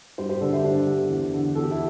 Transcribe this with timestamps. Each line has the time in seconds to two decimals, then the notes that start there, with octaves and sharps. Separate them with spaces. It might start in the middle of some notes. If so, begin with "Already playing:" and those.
0.18 G2 G4 C5
0.29 G4 C5
0.41 D3 A4 D5
0.53 C5 E5
0.64 G2 D4 G4
0.87 D3
1.10 E2
1.33 D3
1.55 E2 A4
1.63 G4
1.71 E4 A4